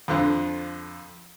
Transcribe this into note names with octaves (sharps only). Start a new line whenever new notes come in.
F2 D3 F3 F#6